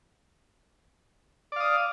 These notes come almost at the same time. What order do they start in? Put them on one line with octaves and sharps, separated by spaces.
D5 F5 D#6